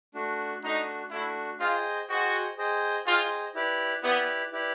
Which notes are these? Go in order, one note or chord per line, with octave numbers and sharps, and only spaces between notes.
A3 D4 F#4
A3 D4 D#4 F#4
A3 D4 E4 F#4
F4 G#4 C5 D#5 G5
F#4 G#4 C5 D#5 G5
G#4 C5 D#5 G5
F4 G#4 C5 D#5 G5
E4 G4 B4 D5
B3 E4 G4 B4 D5
E4 G4 B4 D5